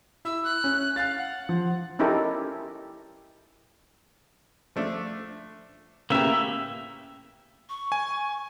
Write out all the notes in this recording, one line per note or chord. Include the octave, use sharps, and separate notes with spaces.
E4 E6
F#6
C#4
F5 F#6 A6
F#5
F3
C#4 D#4 E4 G4 A4 A#4
F3 A3 D4
A2 C#3 A#3 B3 G4 E5
C#6
G#5